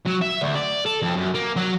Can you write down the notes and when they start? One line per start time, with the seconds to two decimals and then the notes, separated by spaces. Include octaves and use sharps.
0.06 F#3
0.21 E5
0.41 D2
0.55 D5
0.86 A4
1.02 F2
1.16 F#2
1.34 A#3
1.56 F#3